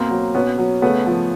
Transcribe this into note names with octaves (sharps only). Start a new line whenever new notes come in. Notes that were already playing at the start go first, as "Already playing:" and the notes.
Already playing: B2 A#3 C4
F#3
B2 B3 C#4
F#3
C#3 A3 B3
F3